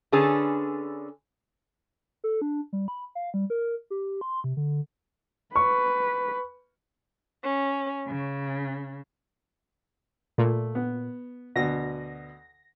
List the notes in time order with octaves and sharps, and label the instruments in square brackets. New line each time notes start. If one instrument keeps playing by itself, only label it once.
[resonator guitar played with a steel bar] D3 C#4 G#4 A4 B4
[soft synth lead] A4
D4
G3
B5
F5
G3
A#4
G4
C6
C3
D3
[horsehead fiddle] B4 [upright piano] C#6
[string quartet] C#4
C#3
[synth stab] A#2 [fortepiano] A3
[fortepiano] B3
[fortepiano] D2 B2 [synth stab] A#6